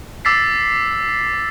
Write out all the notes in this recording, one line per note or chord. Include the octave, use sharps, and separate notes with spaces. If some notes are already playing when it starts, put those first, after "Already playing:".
D6 E6 A6 B6 C7